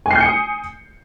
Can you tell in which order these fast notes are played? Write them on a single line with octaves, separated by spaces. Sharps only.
G#5 C7 G6 C#7 D#6